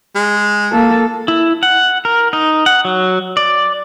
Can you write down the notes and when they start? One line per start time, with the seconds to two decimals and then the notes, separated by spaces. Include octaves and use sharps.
0.15 G#3
0.72 A#3 A4
1.28 E4
1.63 F#5
2.05 A#4
2.33 D#4
2.66 F#5
2.85 F#3
3.37 D5